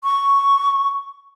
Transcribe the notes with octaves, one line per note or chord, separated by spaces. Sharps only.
C#6